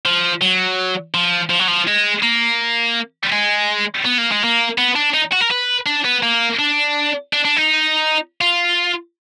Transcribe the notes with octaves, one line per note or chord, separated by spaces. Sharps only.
F3
F#3
F3
F3
F#3
F3
G#3
A#3
G#3
B3
A#3
G#3
A#3
B3
D4
D#4
F#4
A#4
B4
D4
B3
A#3
D4
D4
D4
D#4
F4